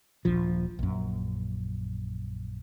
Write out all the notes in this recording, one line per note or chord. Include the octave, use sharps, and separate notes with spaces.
D#1 A#1 F3
A#1 F#2